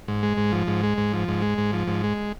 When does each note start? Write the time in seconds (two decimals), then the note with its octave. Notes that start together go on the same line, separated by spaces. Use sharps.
0.08 G#2
0.23 G#3
0.37 G#2
0.53 F3
0.67 G#2
0.83 G#3
0.98 G#2
1.13 F3
1.28 G#2
1.42 G#3
1.58 G#2
1.73 F3
1.88 G#2
2.03 G#3